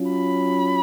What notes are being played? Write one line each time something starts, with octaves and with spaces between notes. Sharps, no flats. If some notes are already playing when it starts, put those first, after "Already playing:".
Already playing: F#3 C#4 F4
B5